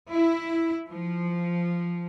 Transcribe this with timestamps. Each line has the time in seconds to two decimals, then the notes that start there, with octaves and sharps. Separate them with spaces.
0.11 E4
0.88 F3